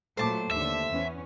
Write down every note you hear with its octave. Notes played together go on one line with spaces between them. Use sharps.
A#2 F#3 A3 C5 A5 D6
D#2 D3 E5
E2 B3 C#4